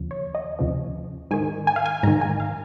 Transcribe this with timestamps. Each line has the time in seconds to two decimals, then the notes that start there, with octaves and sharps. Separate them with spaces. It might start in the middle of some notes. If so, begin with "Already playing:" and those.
Already playing: D#2 C#3 F3
0.11 C#5
0.35 D#5
0.59 D#2 C#3 F3
1.31 G#2 D#3 G#5
1.67 G#5
1.76 F5
1.86 G#5
2.03 G#2 D#3 A#5
2.21 G#5
2.40 F5